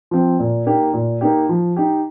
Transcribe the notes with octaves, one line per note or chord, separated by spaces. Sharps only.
F3 C4
A#2
A#3 D#4 G4
A#2
A#3 D#4 G4
F3
D#4 G4